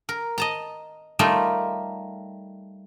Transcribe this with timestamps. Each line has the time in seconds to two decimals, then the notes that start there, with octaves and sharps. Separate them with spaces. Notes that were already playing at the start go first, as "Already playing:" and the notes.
0.09 A#4
0.38 D#5 A5 A#5
1.19 G3 A3 D#4 F4 A#4